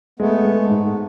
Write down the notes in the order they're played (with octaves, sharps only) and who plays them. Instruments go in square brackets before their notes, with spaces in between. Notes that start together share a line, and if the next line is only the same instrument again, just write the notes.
[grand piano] G#3 [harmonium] A3 B3
[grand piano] G#3
G#2